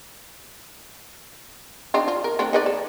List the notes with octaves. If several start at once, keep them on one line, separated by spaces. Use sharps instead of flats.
C4 D4 D#4
F4
A#4
A3 C4 D4
D#4 B4 D5
A4